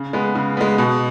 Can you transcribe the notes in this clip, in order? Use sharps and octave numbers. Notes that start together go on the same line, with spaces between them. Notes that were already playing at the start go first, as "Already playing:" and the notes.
Already playing: C#3
G#3 B3
C#3
G#3 B3
B2